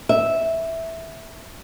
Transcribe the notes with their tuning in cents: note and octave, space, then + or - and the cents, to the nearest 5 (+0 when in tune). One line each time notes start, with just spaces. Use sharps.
E5 -5